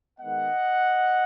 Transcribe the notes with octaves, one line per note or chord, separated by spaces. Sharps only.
D#3 G#3 B3 D#5 F#5